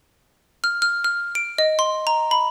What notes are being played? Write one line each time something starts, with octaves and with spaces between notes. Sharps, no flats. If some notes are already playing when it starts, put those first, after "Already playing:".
F6
F6
F6
D7
D#5
C6
A#5
B5